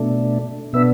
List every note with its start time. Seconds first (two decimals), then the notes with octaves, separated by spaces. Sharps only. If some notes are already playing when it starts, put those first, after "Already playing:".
Already playing: B2 A3 D4
0.73 B2 B3 D4 E5